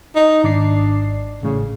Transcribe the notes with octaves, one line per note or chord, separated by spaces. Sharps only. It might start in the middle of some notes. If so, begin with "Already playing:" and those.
D#4
G#1 D4 D5 C7
A1 A2 C#3